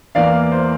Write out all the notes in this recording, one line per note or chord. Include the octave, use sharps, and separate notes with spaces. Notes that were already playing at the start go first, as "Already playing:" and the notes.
E2 E3 A#3 D5 F5
C5